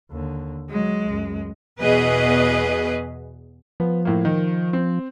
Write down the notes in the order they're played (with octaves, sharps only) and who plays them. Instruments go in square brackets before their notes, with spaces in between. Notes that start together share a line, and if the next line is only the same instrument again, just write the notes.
[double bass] D#2 D3
[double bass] F#3 [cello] G#3
[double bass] C#2 F#2
[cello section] E2 B2 G#4 B4 D#5
[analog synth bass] F3 [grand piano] B3
[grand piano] A2 A#3
D#3
C4